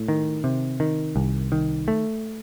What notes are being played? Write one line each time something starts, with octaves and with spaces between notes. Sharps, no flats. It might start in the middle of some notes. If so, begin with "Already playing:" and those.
Already playing: A2
D#3
C3
D#3
C2
D#3
A3